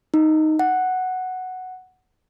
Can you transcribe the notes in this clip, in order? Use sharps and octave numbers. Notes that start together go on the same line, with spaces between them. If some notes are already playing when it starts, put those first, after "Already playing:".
D#4
F#5